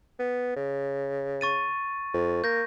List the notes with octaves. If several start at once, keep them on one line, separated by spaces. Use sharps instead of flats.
B3
C#3
C#6 A6 D#7
F2
A#3 G6 A#6